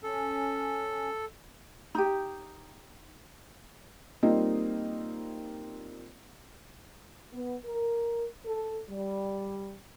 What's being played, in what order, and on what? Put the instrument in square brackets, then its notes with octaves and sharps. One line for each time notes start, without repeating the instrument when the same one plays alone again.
[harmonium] C#4 [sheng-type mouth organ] A4
[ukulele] D#4 G4
[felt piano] G3 A#3 C4 D#4 F4 D#5
[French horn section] B3
A#4
A4
G3